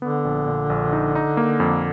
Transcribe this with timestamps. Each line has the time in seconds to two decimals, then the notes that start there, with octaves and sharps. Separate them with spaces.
0.02 D3 B3
0.25 A#1
0.47 A#2
0.70 A#1
0.93 D#4
1.15 D#4
1.37 A#3
1.60 F2